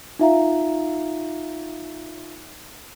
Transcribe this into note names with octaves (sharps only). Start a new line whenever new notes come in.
D#4 F4 E5 F5 A#5